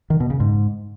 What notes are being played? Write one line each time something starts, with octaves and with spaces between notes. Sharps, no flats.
D#3
B2
C#3
G#2